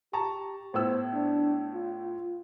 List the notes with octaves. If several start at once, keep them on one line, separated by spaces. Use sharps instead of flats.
G4 A5 A#5 C#6
A2 B3 C5 E6
D4
F4